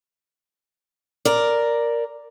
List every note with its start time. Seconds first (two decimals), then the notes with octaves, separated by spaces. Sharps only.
1.25 A#4 D5